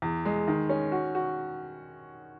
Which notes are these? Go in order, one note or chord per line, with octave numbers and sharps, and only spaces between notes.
E2
G#3
D#3
C#4
F#4
F#4